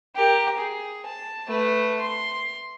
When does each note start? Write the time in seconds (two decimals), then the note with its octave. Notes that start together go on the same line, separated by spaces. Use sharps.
0.15 G4 A#4
0.58 G#4
1.06 A5
1.48 A3 B4
2.00 C6